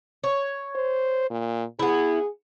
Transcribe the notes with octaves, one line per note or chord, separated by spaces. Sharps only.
C#5
C5
A#2
B3 E4 G#4